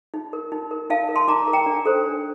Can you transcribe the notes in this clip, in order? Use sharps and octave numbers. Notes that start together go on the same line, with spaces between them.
D#4
A#4
D#4
A#4
D#4 F5 A5
A#4
A5 C6
D#4 A#5 D6
A#4
G5 A#5
D4
A4 C5
D4